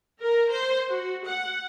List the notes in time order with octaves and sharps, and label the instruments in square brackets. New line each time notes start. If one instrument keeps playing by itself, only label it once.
[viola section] A#4
C5
F#4
F#5